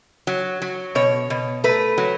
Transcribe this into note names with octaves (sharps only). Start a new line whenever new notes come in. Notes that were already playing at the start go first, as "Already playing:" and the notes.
F#3
F#3
B2 C#5
B2
A3 B4
F#3